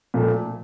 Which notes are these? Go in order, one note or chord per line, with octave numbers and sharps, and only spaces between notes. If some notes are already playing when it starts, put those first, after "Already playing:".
A#2 F3 A3